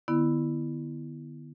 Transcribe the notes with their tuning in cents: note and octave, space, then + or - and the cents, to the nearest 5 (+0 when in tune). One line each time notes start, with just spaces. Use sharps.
D3 +35 B3 +0 E4 +0